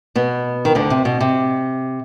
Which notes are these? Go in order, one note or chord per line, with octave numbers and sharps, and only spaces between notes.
B2 B3
D#3
D2 D3
C3
B2
C3